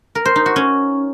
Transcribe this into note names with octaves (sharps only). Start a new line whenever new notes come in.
A#4
C5
D#4
F#4
C#4